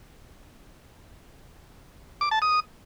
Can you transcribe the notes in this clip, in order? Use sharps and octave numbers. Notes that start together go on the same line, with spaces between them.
D6
A5
D#6